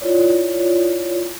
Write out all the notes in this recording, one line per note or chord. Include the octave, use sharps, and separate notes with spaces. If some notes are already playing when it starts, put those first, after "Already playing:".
E4 F4 C#5 D5